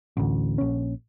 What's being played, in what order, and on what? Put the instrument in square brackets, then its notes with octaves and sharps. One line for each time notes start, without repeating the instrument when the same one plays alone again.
[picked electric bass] A1 D2
A#1 C#4